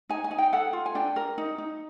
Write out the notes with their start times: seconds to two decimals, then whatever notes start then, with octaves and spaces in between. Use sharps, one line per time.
0.10 D#4 G#5
0.24 G#5
0.31 D#4
0.38 G5
0.53 A4 F#5
0.73 F4
0.86 G#5
0.95 D4 G5
1.16 A#4
1.38 D#4
1.58 D#4